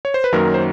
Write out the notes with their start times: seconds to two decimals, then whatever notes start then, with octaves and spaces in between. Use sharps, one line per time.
0.05 C#5
0.14 C5
0.24 B4
0.33 F#2 D#3 F#3 A#3 A#4
0.54 C5